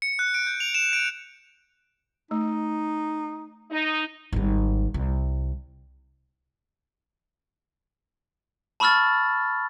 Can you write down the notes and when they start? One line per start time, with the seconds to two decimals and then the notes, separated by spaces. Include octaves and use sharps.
0.02 C#7
0.19 F#6
0.34 D7
0.47 G6
0.60 F7
0.75 E7
0.93 D7
2.31 A3 D#4
3.71 D#4
4.33 G#1 G3
4.94 C2
8.80 A5 B5 C#6 E6 F6 A6